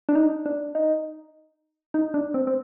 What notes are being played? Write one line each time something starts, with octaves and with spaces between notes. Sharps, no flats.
D4
D#4
D4
D#4
D#4
D4
C4
C4